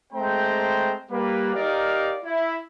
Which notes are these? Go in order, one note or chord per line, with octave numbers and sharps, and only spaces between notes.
G#3 A3 C4 C5 G5 A#5
G3 A#3 B4
D#4 G4 A#4 D5 F5
E4